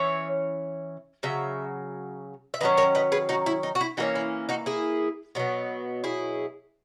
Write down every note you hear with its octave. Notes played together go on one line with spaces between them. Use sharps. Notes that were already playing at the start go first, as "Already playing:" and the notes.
Already playing: E3 C#4 C#5 E5
C#3 F#3 E5
E5
D#3 F#3 C#4 B4 D#5
A#4 C#5
B4 D#5
G#4 B4
D#4 F#4
E4
D#4
F#4
E4
E3 A#3 C#4 D#4 F#4
E4
D#4 F#4
E4 G#4
B2 F#3 B3
E4 G#4